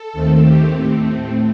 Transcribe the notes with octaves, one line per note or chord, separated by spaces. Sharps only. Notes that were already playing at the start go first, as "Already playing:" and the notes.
Already playing: A4
D#2 D#3 A3 C4
G4
A2 A3 C4